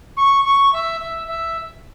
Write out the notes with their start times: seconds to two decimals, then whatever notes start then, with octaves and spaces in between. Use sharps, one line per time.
0.16 C#6
0.44 C#6
0.72 E5
1.00 E5
1.27 E5